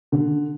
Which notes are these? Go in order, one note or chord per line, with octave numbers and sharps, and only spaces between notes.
D3